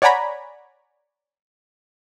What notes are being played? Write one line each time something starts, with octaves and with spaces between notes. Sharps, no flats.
C#5 D5 F#5 G#5 A#5 B5